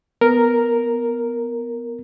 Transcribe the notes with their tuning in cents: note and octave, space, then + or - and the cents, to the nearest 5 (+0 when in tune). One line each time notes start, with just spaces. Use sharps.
B3 +0 A#4 +0